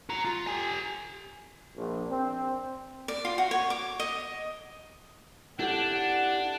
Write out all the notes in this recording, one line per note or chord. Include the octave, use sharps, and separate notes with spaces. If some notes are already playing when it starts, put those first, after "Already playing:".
F#4 A#5
F4
G4 G#5
A#1
C4
D5
F4
F#4
C#5
D6
D#5
D4 E4 G4 A4 F#5